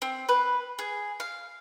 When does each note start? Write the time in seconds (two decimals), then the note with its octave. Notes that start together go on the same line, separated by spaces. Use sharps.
0.02 C4
0.29 B4
0.79 G#4
1.20 F5